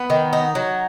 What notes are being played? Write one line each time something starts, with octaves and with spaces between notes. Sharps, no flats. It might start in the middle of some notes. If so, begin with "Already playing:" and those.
Already playing: B3
D#3
D#4
F#3